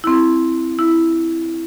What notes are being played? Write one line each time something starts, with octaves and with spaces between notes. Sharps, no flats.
C4 E4
E4